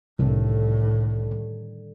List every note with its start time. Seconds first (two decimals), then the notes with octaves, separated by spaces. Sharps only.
0.19 C2 A2 D3 D#3 G3